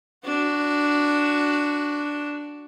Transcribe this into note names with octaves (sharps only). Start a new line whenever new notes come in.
D4 F#4